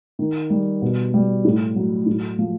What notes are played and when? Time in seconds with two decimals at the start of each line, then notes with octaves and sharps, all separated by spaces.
0.19 D#3
0.50 G3
0.82 B2
1.14 G3
1.45 A2
1.76 F#3
2.06 A2
2.39 F3